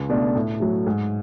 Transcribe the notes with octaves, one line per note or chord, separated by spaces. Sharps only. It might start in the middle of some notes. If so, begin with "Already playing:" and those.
Already playing: C#2
B2 A3 D4
A2
F#3 A3
G#2